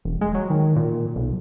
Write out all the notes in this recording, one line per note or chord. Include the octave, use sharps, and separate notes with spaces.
E1
G#3
F#3
D#3
A#2
B1